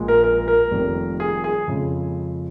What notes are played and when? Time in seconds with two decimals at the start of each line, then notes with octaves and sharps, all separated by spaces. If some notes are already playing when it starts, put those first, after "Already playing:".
Already playing: A#1 A#2 G#3
0.08 A#4
0.24 A#4
0.48 A#4
0.71 F1 F2 D#3 G3 A#3
1.20 G#4
1.44 G#4
1.67 F2 C#3 G#3